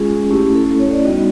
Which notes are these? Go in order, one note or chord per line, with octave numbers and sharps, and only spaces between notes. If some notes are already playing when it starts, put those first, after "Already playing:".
Already playing: G#3 C#4 F4 G#4
A3 C#4 E4 G4
A4
A4
C#5
D5
G3 B3 D#4 F#4 D#5